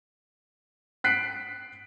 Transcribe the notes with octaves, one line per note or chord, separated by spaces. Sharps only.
F#6 B6 C7 D7